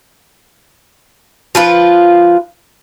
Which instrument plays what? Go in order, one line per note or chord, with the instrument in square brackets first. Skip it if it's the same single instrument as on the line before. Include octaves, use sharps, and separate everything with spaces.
[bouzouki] F3 F4 B4